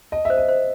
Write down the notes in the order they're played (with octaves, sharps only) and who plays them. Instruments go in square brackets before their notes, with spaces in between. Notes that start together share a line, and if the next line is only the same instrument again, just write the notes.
[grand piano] D#5 [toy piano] A5
[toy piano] C5 [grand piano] E5
[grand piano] D#5
[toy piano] C5